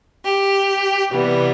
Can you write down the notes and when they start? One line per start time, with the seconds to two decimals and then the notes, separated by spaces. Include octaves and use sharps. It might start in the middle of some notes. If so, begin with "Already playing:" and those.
0.25 G4
1.13 C3 E3 G3 B3